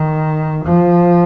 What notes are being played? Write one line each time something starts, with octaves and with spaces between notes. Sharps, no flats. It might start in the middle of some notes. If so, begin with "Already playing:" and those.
Already playing: D#3
F3